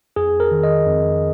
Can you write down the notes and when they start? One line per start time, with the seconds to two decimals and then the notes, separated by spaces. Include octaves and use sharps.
0.16 F2 G#4
0.40 A#4
0.51 D#3
0.63 D#5
0.87 F2